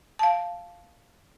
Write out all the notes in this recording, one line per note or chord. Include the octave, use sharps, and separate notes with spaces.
F5 A5